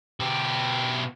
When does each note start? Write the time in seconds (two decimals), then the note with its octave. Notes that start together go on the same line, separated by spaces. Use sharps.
0.20 B2 G4